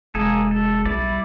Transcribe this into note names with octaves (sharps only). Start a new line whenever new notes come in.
F1 G#3 A#3 G#4 A4
A4
B1 G3 E4 D5